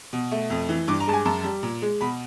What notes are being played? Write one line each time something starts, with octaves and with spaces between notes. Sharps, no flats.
B2
A3
F2
E3
G2 D6
A#5
G#3 A5
G#5
F#2 A5
G3
A#2
G#3
B2 B5